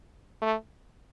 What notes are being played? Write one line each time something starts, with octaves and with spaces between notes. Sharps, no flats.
A3